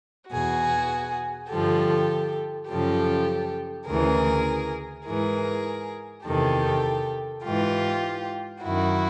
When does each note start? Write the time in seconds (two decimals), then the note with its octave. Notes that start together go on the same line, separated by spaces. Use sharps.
0.31 E2 B2 F#4 G#4
1.50 G2 D3 F3 G4 A4
2.69 F#2 C#3 F3 G4 A4
3.88 D2 C#3 E3 G#4 A#4
5.06 G#2 E3 G#4 A#4
6.26 E2 C3 D#3 G4 A4
7.44 G#2 E3 F4 G4
8.63 F#2 D#3 E4 F#4